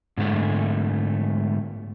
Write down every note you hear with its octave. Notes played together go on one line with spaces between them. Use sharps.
G#2 D3 G#3 A3